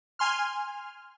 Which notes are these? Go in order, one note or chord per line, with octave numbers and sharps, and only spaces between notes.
G#5 C6 F6